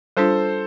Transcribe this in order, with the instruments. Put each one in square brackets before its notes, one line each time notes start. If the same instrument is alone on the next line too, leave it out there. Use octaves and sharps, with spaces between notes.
[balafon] G3 D4 F4 [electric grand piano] A4 C5